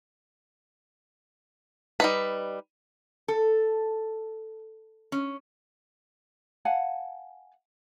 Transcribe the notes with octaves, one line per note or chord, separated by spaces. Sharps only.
G3 D#4 B4
A4
C#4
F5 F#5 G#5 A5